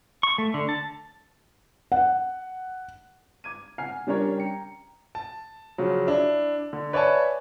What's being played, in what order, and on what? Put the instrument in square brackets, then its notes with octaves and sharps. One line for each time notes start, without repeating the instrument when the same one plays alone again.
[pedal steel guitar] C#6
A3
D3
A5
[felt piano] F#5
[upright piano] D6 G#6 D#7
F#5 G#5 F6 C7
G3 C#4 D4 A#4 C#5
G5 A#5 C#7
[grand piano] A5
C#3 F3 F#3
D4 E4
D3
B4 C#5 D5 E5 G#5 A5